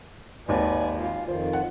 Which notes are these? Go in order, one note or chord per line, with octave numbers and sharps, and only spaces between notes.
G#1 D#2 B4 D5 G#5
F4 F5
F2 D#3 F4 C5
F#5